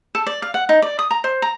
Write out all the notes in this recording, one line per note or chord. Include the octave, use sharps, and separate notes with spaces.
A4
D5
F5
F#5
D#4
D5
D#6
A#5
C5
A#5